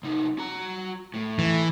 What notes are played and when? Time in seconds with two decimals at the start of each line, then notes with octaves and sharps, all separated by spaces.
0.03 C2 D#4
0.39 F#4 A#5
1.14 A2
1.39 E3